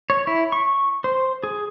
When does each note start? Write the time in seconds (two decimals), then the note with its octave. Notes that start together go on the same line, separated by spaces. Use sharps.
0.10 C#5
0.27 E4
0.52 C#6
1.04 C5
1.44 G#4